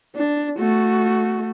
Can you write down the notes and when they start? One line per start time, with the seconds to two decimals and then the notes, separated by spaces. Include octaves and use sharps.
0.16 D4
0.59 A3 F#4